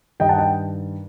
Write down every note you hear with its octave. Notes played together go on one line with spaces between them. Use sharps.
G2 D#3 G3 D#5 G5
F#5 A5
D#5 G5